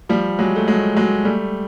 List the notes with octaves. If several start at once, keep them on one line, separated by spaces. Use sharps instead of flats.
F3 G3
F#3 G#3
A3
F#3 G#3
F#3 G#3
G3 A3